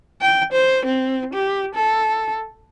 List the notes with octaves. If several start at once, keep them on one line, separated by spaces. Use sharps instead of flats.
G5
C5
C4
G4
A4